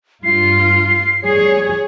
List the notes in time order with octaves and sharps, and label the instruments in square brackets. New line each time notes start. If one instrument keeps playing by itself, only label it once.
[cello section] G2 F4 [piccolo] C7
[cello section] G3 G#4 C#5